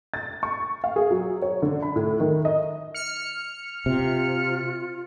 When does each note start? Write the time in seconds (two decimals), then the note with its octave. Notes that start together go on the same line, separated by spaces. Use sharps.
0.14 A6
0.43 C#6
0.84 F5
0.96 G#4
1.10 F#3
1.42 C#5
1.62 D3
1.82 B5
1.96 A2
2.20 D#3
2.45 D#5
2.94 F6 C#7
3.86 C3 F4